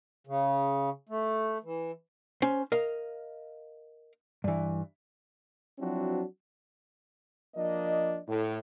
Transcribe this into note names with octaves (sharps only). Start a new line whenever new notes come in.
C#3
A3
E3
C#4 C5
A#4 D#5 F5
G2 E3
F3 F#3 C4 D4 E4 F#4
F3 A#3 D4 D#5
A2